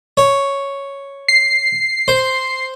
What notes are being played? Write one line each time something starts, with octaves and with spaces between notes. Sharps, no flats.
C#5
C7
C5